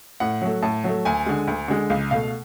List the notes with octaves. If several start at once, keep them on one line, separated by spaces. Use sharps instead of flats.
A2 F#5
F#3 A3
A2 A5
F#3 A3
D2 G#5
D3 G#3
D2
D3 G#3
C#2 F5
B2 A3 F5